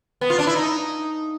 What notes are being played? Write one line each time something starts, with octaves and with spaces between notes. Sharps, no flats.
B3
F4
D4
E4
D#4